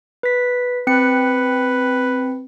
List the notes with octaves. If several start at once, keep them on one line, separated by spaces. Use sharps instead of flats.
B4 B6
C4 B4 C#7